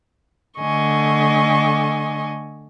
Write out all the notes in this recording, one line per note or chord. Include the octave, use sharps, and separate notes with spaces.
D3 A3 D#5 G#5 C#6